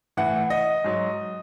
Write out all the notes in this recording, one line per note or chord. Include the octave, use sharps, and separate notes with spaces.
A2 E3 F#5
D#5
G#2 F#3